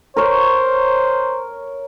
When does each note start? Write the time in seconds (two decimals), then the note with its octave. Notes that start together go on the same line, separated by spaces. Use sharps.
0.17 A#4 C5 C#5